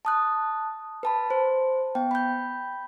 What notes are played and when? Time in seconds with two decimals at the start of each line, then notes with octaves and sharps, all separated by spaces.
0.05 A5 D#6 F#6
1.03 B4 A5 B5
1.30 C5
1.95 B3 G5
2.11 B5 G6